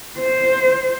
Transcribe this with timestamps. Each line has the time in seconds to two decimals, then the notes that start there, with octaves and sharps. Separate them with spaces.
0.18 C5